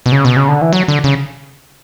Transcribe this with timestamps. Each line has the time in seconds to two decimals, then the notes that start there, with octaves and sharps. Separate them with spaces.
0.06 B2
0.12 C#3
0.25 B2
0.36 C#3
0.49 D3
0.62 E3
0.73 F#3
0.88 D3
1.04 C#3